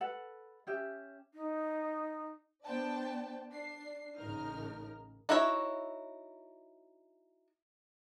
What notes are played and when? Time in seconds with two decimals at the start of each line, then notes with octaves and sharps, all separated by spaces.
0.01 A4 B4 F#5
0.67 C#4 G4 E5
1.34 D#4
2.64 B3 D4 C5 D5 G5 A5
3.50 D4 C7
4.18 A1 C#3 G#3 D#4 A#4 F6
5.29 D#4 E4 F#4 C#5 E5